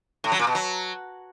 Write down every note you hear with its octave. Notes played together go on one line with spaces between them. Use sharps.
A2
F#3
A#2
B2
F#3